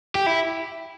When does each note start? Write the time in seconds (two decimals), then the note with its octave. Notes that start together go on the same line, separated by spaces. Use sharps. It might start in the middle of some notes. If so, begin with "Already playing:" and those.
0.15 G4
0.26 E4